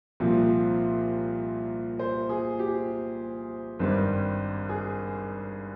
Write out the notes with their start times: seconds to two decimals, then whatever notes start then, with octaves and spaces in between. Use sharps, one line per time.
0.20 C2 A#2 F3 C4
1.99 C5
2.29 G#4
2.59 G4
3.79 G#1 G2 G3 C4
4.69 G#4